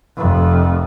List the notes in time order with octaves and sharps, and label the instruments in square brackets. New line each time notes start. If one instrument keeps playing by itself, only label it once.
[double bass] F1 F2